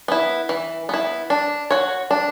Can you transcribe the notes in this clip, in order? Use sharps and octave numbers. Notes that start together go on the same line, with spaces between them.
B3 E4
E3
B3 E4
D4
F#4 C#5
D4